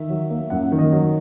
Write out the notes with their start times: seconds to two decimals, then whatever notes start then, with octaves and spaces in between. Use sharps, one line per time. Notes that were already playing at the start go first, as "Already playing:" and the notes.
Already playing: D#3 E5
0.10 F#3
0.31 A#3
0.50 F#2 F#5
0.72 D#3
0.79 D#5
0.92 F#3